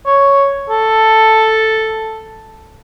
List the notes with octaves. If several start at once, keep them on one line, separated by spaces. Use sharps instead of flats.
C#5
A4